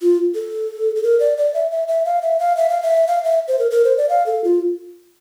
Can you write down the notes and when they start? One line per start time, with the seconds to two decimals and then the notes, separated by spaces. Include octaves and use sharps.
0.02 F4
0.35 A4
0.96 A4
1.04 A#4
1.20 D5
1.38 D5
1.54 E5
1.71 E5
1.88 E5
2.05 F5
2.22 E5
2.40 F5
2.57 E5
2.70 F5
2.82 E5
3.08 F5
3.24 E5
3.48 C5
3.59 A#4
3.71 A#4
3.85 C5
3.97 D5
4.09 F5
4.26 A4
4.44 F4